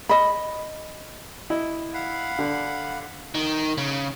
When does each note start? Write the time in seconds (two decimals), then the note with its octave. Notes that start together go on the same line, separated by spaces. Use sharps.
0.09 D#5 B5
1.50 E4 D#5
1.94 F5 F#5 B5
2.39 D3
3.34 D#3
3.78 C#3